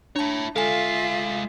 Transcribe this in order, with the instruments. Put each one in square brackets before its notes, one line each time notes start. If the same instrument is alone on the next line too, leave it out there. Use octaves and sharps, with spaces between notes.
[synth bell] D4 A5 [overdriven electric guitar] E4 C#5
[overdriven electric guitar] G#3 F5 [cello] F4 E5 [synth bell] A4 G#5